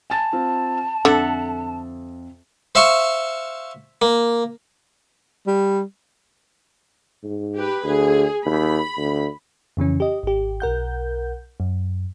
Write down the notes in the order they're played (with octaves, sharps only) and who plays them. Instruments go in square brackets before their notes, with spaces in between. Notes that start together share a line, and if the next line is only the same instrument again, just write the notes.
[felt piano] G#5 A6 [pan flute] A5
[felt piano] C4 F4
[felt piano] F2 [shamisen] D3 [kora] A4 E5 F#5
[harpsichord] C5 E5 F5 C6 C#6
A#3
[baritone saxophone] G3
[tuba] G#2
[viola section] G4 B4
[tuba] D2 [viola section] G#4
[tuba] D#2 [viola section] B5
[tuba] D2
[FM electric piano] F2 C#3 E3 C#4
G4 D#5
G#1 G4
B1 A#4 F#5 G6
F#2